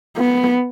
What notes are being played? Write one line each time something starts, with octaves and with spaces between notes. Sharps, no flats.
B3